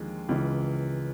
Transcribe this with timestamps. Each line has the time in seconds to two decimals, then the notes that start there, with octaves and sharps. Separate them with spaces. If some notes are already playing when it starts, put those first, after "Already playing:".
Already playing: D#2 D3 F3 G#3
0.29 C#2 C#3 E3